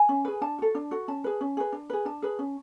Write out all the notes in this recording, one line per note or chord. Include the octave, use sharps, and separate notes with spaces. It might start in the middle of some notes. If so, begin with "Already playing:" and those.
Already playing: G#5
C#4
G#4 B4
D4 A5
F#4 A4
D4
F#4 A4
C#4 A5
G#4 B4
C#4
G#4 B4
D4
G#4 B4
D4 A5
G#4 B4
C#4